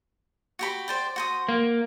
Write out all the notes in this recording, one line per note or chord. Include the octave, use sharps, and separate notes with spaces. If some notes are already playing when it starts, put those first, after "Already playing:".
F#4 G4 B5
C5 D5 G5
F#4 C5 D#6
A#3